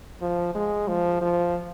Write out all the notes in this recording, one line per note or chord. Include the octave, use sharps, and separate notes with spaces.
F3
G#3
F3
F3